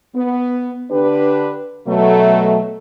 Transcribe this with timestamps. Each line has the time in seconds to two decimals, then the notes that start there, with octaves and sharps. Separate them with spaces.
0.16 B3
0.91 D3 D4 G4 B4
1.87 B2 F#3 A3